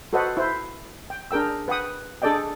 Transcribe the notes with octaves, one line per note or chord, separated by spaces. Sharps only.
F#4 A4 B4 C5 D#5 F#5
E4 C5
G5
D4 G#4 A#4 G5 E6
B4 F#5 G5 D#6
D4 G#4 A4 D5 D#5 G5